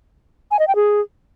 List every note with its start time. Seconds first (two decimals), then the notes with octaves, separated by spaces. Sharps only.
0.51 G#5
0.59 D#5
0.68 G5
0.76 G#4